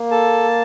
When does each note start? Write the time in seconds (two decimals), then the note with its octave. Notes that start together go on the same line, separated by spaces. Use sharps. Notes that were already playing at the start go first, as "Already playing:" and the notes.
Already playing: A#3
0.11 A4 A5